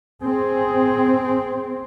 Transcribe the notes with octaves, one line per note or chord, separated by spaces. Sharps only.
C4 G#4